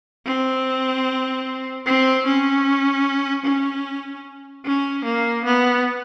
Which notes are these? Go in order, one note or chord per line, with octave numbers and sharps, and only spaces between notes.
C4
C4
C#4
C#4
C#4
A#3
B3